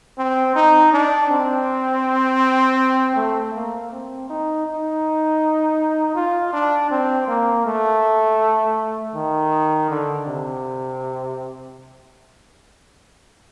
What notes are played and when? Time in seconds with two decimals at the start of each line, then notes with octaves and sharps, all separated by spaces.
0.18 C4
0.55 D#4
0.93 D4
1.30 C4
3.16 A3
3.54 A#3
3.91 C4
4.30 D#4
4.67 D#4
6.16 F4
6.53 D4
6.91 C4
7.28 A#3
7.65 A3
9.15 D#3
9.90 D3
10.26 C3